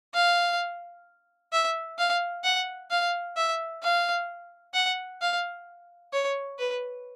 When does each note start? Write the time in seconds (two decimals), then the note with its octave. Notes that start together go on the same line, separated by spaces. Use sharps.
0.14 F5
1.52 E5
1.98 F5
2.44 F#5
2.91 F5
3.37 E5
3.83 F5
4.74 F#5
5.21 F5
6.13 C#5
6.59 B4